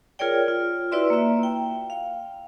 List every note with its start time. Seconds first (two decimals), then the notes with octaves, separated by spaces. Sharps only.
0.19 F4 G#4 A#4 C#5 D5 G5
0.48 F4
0.92 E4 F#4 B4 D5 E5 C6
1.10 A#3 E5
1.43 G5
1.90 F5